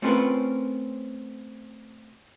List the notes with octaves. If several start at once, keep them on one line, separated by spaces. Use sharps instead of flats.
A3 C4 C#4 F4 A#4 B4